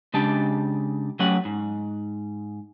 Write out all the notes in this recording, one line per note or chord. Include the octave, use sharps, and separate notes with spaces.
C#3 G#3 D4 G4 A5
F#3 A3 C#4 G4 F#5
G#2